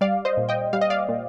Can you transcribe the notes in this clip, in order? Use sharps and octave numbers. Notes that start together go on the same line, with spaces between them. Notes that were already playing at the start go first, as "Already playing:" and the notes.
G3 D5 F5
C5 D#5
A#2
D#5 G5
G3 F5
D#5
D5 F5
A#2